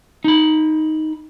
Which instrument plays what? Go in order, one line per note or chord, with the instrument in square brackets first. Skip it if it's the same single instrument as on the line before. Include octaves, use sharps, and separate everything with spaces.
[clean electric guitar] D#4 B5